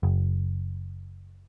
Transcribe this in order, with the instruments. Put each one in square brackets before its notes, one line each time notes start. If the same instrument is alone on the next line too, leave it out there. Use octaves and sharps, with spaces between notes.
[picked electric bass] F#1